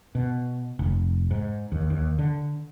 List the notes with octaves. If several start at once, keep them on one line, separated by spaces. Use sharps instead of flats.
B2
F1
G#2
D#2
D#2
D3